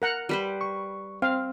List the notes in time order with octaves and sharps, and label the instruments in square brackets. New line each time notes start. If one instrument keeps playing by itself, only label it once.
[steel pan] A#4 F#5 A#5
[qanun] G3 B4 C5
[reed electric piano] C#6
[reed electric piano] C4 [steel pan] F5